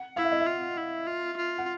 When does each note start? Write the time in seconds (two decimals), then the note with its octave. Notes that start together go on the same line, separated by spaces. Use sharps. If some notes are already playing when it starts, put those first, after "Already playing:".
Already playing: F#5
0.16 E4 F5
0.24 E5
0.32 D#5
0.40 E5
0.46 F4
0.78 E4
1.07 F4
1.37 F4
1.58 F#5